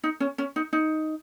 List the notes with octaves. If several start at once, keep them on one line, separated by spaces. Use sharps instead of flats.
D#4
C#4
C#4
D#4
D#4